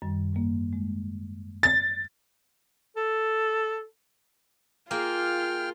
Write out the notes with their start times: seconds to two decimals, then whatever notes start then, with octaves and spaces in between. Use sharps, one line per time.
0.02 F#2 D#3 G3
0.33 G#2 G3 A#3
0.73 G#3
1.63 A6
2.96 A4
4.91 A#3 F4 G#4 G5 F6